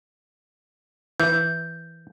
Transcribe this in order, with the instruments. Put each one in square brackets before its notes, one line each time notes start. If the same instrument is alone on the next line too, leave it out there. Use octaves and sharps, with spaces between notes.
[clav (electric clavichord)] E3 [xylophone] G6